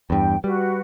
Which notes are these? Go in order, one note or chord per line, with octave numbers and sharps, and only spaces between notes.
E2 G2 G5
G3 F#4 B4